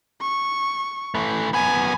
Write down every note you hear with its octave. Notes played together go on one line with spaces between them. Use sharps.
C#6
E3 A3
F#2 B3 G#5